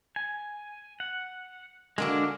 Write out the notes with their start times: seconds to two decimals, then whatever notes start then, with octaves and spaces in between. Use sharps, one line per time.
0.16 G#5
1.00 F#5
1.98 D3 G#3 A#3 D4 F#4